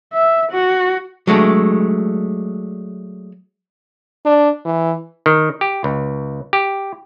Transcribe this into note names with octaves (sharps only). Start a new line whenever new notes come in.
E5
F#4
F#3 G#3 A3 D4
D4
E3
D#3
G4
C#2
G4